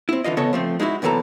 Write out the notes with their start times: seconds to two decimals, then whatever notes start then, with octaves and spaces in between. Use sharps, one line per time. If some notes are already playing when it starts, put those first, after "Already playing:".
0.09 C4 E4
0.24 D3 E3 F4 D#5
0.37 E2 C#3 B3 A4 C#5 D#5
0.53 F3 A3 C4
0.80 G#3 D#4 E4 F#4
1.02 C2 F#2 B2 E3 A4 A#5